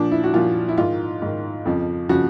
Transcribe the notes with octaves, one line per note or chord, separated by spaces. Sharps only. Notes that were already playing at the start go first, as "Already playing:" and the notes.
Already playing: A#2 F3 D4
E4
F#4
A#2 F3 F4
E4
G#2 D#3 F4
G#2 D#3
F2 C#3 F3
C#3 F3 F#4